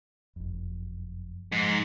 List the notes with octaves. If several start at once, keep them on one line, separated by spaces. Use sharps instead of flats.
F#1 F2
G#2 F3